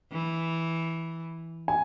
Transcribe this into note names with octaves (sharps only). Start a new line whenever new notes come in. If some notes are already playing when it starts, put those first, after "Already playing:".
E3
G#5